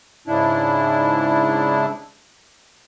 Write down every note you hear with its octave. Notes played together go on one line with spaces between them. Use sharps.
G#2 C#3 D4 E4